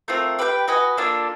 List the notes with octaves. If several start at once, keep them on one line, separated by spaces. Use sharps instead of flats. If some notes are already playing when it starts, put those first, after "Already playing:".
A3 C4 F4 A#4
G4 B4 E5 G5
F#4 B4 D#5 G#5
A#3 D4 F4 A4